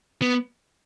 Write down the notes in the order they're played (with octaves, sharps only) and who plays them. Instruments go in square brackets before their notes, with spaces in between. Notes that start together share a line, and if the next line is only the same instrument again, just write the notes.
[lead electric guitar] B3